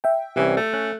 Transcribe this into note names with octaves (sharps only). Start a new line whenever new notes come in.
E5 G5
C2 E3 G3 C#4
A3
C#4 F#6